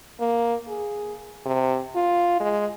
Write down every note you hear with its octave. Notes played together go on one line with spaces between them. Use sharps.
A#3
G#4
C3
F4
G#3